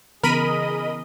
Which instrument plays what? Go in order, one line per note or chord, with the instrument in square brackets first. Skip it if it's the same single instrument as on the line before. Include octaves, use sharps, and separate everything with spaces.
[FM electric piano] C#3 E3 B3 [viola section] G#4 D#5 [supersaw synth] A#4 B5 D#7